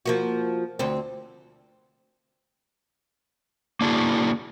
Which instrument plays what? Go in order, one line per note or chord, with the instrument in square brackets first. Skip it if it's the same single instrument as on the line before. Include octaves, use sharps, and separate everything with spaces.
[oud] F3 A#3 F#4
D2 C4
[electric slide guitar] A#3 D4 E4 F#4 G#4